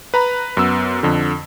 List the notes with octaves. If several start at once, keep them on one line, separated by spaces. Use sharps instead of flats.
B4 A#5 B5
F#2 B3 E6
F2 D3